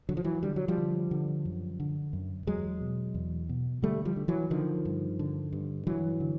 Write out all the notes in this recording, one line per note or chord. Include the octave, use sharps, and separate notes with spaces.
D3 F#3
F3
E3 F#3
D3 G3
F#3
F3 G3
D3
D3
F#2
D3
F#2
E2 F#3 G#3
B2
E2
B2
D3 G3 A3
F3 G3
D3
E3 F#3
D3 D#3 F3
G2
D3
G2
G2 E3 F#3
D3